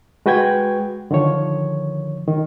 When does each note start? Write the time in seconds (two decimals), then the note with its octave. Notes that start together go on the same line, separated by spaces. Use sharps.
0.26 G#3 F#4 B4 G5 G#6
1.11 D3 D#3 F3 C#5
2.28 D#3